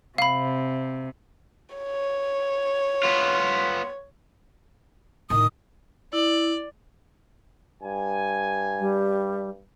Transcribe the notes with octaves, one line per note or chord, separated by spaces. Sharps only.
C3 F5 B5
C#5
B3 F4
A2 D#3 D#6
E4 D5
G2 G#5
G3